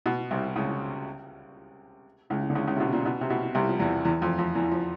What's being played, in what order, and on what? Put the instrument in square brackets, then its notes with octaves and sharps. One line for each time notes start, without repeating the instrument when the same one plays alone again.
[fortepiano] B2
C2 C3
C#2 C#3
C#2 C#3
D3
C#2 C#3
C#2 C#3
C3
B2
A#2
B2
C3
B2
C2 C3
F3
E2 E3
E2 E3
F2 F3
F2 F3
E2 E3
F3